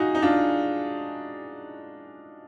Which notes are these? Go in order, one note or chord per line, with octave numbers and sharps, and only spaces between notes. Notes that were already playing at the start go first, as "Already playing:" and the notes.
Already playing: D#4 F4 F#4 G#4
D#4
D4 F4